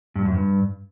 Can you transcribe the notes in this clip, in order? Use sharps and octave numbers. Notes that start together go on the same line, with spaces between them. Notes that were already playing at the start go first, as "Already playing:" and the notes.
G2
F#2
G2